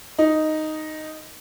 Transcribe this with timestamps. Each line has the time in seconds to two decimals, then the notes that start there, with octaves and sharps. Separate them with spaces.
0.18 D#4